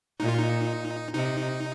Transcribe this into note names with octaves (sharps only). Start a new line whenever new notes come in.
A#2 D#4
F4
D#4
C3 D#4